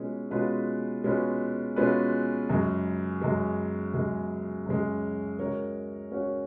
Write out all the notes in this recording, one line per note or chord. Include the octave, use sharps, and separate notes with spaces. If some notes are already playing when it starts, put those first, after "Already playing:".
Already playing: B2 G#3 C#4 F4 B4
B2 G#3 C#4 F4 B4
B2 G#3 C#4 F4 B4
B2 G#3 C#4 F4 B4
F#2 C#3 G#3
F#2 C#3 G#3
F#2 C#3 G#3
F#2 C#3 G#3
G#3 C#4 F#4 A#4 C#5
G#3 C#4 F#4 A#4 C#5